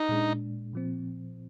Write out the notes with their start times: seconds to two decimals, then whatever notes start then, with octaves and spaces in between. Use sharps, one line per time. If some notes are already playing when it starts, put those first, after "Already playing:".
Already playing: D#4
0.09 A#2 G#3 D4
0.73 A#2 F3 C4